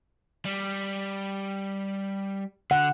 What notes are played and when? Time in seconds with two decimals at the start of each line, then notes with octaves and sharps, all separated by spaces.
0.45 G3
2.71 D3 F#5